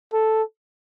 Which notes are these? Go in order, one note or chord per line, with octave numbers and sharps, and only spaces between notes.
A4